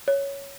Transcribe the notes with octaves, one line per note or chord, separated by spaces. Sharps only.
C#5